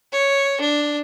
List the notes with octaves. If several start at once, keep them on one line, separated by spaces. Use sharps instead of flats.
C#5
D4